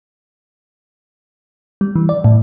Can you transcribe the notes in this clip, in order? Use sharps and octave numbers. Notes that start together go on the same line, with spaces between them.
G3
E3
D5
A2